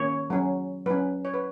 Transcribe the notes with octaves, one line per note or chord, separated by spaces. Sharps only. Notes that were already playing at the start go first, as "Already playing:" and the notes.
Already playing: D#3 A#3 C#4 C#5
F#3 C#4
F#3 C#4 B4
C#5
B4